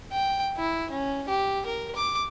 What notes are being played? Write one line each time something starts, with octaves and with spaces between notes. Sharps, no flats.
G5
E4
C#4
G4
A#4
D6